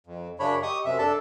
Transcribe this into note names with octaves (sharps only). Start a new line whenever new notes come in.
F2
F#2 C#3 D4 C#5 B5
G4 D#5 C#6 D#6
F#2 C3 E5
D4 A4 A5